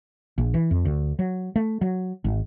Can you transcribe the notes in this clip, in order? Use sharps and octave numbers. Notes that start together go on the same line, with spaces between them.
A#1
E3
F2
D2
F#3
A3
F#3
G#1